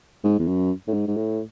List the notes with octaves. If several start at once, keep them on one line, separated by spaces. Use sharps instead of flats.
G#2
E2
F#2
A2
G#2
G#2
A2